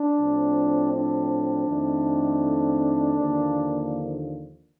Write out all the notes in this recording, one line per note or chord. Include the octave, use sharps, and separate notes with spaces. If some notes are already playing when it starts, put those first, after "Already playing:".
Already playing: D4
A2 F3 C4
D4
F2 D#3 A3 C4
D#2 D3 F3 A#3